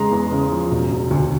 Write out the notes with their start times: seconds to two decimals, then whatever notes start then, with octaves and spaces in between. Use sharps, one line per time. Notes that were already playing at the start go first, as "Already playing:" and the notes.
Already playing: E2 C#3 G#3 A#5 C6
0.11 E2
0.31 C#3
0.52 F3
0.71 E1
0.91 E1
1.11 D2